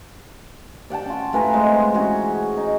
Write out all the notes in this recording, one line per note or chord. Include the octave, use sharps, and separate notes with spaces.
D5 F#5 G5 A5
C#4 F4
A2 B4 G#5 A#5
G#3 C4
E3 C#4 F#4 G#4
D#4